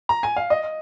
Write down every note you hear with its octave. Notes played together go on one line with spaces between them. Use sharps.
A#5
G#5
F5
D#5